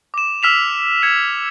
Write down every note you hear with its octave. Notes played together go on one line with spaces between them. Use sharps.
D6 E7
E6 F6 B6 E7 F7
G#6 C#7 E7